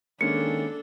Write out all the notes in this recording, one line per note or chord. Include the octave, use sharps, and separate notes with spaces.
D#3 G#3 A#3 C#4 D4 A4 C#7